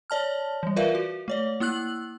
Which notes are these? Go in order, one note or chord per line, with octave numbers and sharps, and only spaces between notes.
C#5 D5 A5 F6
E3 G3
F4 A#4 B4 D5 E5 F5
F#4
A3 C#5 D5
A#3 E4 E6 F#6 F#7